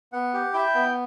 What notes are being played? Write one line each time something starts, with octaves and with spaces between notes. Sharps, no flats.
B3 F#5
G4
E4 G5
B3